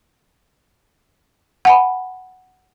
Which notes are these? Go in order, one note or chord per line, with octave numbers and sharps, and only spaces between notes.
F#5 G#5 B5